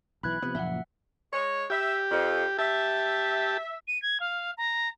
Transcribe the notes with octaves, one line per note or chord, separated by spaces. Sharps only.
B1 E3 B5 F#6 G#6
C3 F3 B3
F#1 A#2 F3 E5 F#5
G#3 C#5
G4 E5
F2
G4 E5 A5
D#7
G#6
F5
A#5